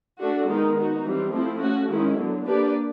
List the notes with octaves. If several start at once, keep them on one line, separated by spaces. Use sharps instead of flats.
A3 D4 F#4
D#3 G#3 B3 D#4 G#4
B3 D#4 F#4
E3 G3 C4
F3 A3 C4 E4
A3 C#4 F#4
D#3 G#3 C#4 E4
D3 F#3 B3
A#3 D4 G4 B4 D5